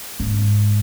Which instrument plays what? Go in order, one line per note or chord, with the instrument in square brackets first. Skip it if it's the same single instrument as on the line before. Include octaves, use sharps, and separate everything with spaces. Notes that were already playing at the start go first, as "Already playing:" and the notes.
[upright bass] G#2